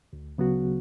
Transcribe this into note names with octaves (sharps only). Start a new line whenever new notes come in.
D2
C#3 F#3 B3 F#4